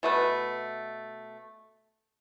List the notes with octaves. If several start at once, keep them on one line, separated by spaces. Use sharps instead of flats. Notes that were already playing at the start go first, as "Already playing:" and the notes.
B2 A3 B4